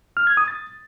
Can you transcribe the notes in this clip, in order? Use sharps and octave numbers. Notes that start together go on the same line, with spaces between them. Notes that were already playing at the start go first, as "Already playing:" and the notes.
F6
G#6
D#6
A6